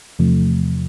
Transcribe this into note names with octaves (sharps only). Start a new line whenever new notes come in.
E2 C3 F3 A3